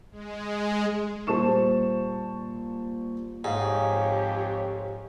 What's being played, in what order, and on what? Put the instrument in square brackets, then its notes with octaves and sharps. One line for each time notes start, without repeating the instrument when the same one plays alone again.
[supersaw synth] G#3
[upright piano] A#2 G3 C5 A5 C#6 E7
[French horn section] F2 G4 C#5 [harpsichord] G#2 [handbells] F5 G#5